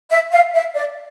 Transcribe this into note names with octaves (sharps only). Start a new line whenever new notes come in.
E5
F5
E5
D5